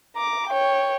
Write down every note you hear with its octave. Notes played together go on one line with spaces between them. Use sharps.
A#5 D6
C#5 G5